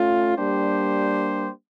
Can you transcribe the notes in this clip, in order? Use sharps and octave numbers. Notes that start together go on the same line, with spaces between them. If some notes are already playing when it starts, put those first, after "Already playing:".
Already playing: A3 C#4 F4
G3 A#3 D4 G4 C5